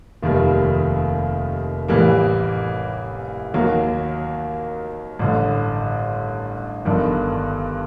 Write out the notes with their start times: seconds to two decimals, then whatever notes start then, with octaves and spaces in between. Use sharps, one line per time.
0.23 F1 D#2 D#3 G3
1.88 A1 A2 E3 G3 A#3
3.54 D#2 D#3 F#3 A#3
5.19 A1 G2 D3
6.85 G1 G2 D#3